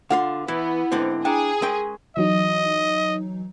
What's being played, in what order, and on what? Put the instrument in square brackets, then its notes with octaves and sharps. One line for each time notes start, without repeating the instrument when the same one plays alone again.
[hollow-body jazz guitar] D3 F4 F5 [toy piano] F#5
[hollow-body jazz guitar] E3 [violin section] B3 [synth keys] E4
[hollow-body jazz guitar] G#2 D3 C4
[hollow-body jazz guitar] D4 [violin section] G#4 [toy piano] G5 A#5
[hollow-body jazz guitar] G#3 C#4 G5 [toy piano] A#4 D#6
[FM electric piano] E3 F#3 D#4 [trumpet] D#5